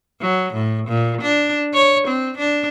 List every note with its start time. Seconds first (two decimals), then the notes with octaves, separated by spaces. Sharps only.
0.21 F#3
0.54 A2
0.88 A#2
1.22 D4
1.73 C#5
2.08 C4
2.38 D4